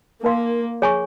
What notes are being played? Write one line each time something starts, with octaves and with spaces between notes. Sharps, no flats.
A#3 D#4 A#4 F5 C6
G#4 C#5 G#5 C#6